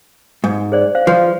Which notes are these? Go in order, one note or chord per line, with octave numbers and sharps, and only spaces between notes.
G#2
G#4 C5 D5
C5 F5
F3 B4